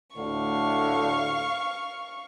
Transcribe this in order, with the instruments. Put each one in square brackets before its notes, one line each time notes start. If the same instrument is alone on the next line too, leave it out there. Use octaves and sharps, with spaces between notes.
[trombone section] D2 A2 D3 [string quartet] F5 C#6